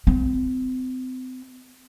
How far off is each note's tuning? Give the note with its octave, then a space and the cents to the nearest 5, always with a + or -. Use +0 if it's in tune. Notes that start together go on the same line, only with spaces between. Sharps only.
C4 -35